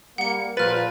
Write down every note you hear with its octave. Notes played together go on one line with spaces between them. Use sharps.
G3 A#3 F#5 C#7
A#2 F3 F4 B4 F6 A6